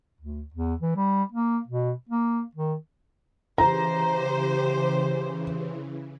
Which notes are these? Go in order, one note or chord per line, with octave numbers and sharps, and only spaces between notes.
D2
E2
E3
G3
A#3
B2
A#3
D#3
C#3 E3 G4 C5 A#5